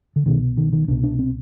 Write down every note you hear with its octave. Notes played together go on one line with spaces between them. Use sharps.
D3
C2 B2 D#3
D#3
D#3
C2 B2 D4
D4
C4